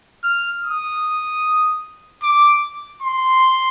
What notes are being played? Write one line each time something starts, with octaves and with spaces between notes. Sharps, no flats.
F6
D#6
D6
C6